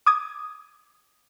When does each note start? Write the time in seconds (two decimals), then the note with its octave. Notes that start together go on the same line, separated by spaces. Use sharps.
0.06 D6 D#6 G#6